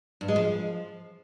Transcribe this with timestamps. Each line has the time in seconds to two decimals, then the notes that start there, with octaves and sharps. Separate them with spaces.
0.21 G2
0.28 G#3
0.36 F3